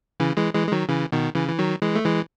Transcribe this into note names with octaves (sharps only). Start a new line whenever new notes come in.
C#3 E3
E3 G#3
E3 G#3
G#3
D#3 F#3
C#3 E3
B2 D#3
C#3 E3
E3
D#3 F#3
E3 G#3
A3
E3 G#3